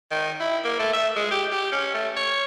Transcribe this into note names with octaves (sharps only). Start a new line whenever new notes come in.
D#3
E4
A#3
A3
E5
G#3
G4
G4
C#4
A3
C#5